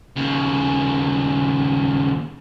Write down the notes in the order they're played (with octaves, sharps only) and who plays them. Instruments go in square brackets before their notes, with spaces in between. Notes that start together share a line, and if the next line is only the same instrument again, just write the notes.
[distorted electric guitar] D#2 C#3